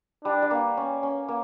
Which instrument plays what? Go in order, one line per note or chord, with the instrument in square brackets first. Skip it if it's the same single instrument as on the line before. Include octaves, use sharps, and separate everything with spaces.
[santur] G3 [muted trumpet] D4
[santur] G3
A#3
C#4
C#4
A#3